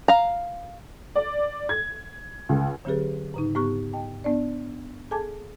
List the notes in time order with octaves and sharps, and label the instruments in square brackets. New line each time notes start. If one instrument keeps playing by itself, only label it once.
[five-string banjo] F5 A#5
[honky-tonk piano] D5
G#6
C#2
[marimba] D3 F#3 C4 G4 G#4 B4
G#2 C#3 D#4
G#2 B3 G4 C#6 F#6
D#5 G5 A5
B3 D4 D5
G#4 A4 G#5 A5 D6 G#6